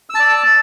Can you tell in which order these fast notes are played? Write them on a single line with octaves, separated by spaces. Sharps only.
E6 A5 D5